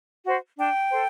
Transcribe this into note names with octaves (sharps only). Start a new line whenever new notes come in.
F#4 C5
D4 G5
A4 C5